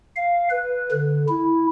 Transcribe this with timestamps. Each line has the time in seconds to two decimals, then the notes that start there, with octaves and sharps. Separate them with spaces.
0.16 F5
0.51 B4
0.92 D3
1.28 E4